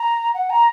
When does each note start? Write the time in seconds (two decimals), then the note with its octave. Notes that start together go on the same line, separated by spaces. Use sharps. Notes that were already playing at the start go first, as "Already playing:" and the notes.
Already playing: A#5
0.34 F#5
0.50 A#5